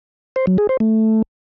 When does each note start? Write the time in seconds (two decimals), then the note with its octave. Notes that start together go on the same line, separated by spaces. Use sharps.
0.36 C5
0.47 F#3
0.58 G#4
0.69 C5
0.80 A3